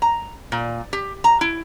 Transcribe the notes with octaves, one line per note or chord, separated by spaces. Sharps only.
A#5
A#2
G4
A#5
E4